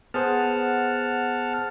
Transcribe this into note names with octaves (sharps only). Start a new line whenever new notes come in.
B3 G#4 C5 F#5 A5 F6